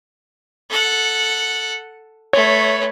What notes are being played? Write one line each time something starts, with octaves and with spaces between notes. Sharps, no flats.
A4 F#5
A3 B4 C#5